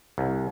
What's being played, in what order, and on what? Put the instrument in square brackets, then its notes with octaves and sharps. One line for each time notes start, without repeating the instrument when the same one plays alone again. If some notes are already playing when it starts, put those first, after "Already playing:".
[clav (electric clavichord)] C2